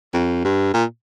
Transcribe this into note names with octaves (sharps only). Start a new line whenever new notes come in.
F2
G2
A#2